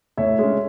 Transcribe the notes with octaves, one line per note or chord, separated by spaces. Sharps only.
A2 C#5 E5
G#3 C#4